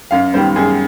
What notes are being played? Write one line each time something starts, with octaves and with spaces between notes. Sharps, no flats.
F#2 F5
D#3 G3 B3 C5
F#2 G#4